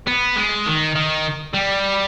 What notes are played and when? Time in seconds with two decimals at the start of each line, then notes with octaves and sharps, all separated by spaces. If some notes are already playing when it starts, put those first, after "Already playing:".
0.07 B3
0.36 G#3
0.66 D#3
0.95 D#3
1.54 G3